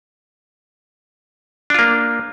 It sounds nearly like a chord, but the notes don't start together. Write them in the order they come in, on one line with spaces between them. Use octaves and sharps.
D4 F4 A#3